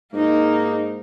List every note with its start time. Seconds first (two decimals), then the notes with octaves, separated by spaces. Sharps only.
0.13 G#2 A#3 D#4